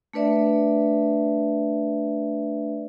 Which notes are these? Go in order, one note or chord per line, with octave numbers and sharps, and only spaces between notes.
A3 D4 B4 D5 E5